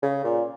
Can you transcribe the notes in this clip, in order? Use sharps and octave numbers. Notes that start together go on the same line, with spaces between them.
C#3
A#2